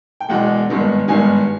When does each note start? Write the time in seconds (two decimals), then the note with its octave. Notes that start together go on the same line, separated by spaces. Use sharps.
0.20 G5
0.29 E1 E2 B2 G#3 F#5
0.69 G#1 G2 D#3 G#3 B3
1.08 G#1 G2 D#3 G#3 B3 G#5